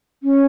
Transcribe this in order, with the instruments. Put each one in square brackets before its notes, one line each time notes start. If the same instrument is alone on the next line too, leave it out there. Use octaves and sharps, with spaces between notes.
[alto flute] C#4